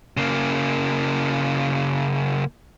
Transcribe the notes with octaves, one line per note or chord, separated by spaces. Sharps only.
C#3 A#3